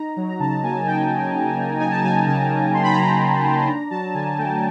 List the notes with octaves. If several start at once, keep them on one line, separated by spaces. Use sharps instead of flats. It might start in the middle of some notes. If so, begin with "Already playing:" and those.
Already playing: D#4 A#5
F#3
A#5
C#3 A5
A#3 G#5
D#4 G5
F#3
C#3
A#3
D#4 G#5
A5
F#3 G#5
C#3 A5
A#3
D#4 C6
B5
A#5
F#3 B5
C#3
A#3
D4 A#5
F#3 A5
D3 G#5
A3 G5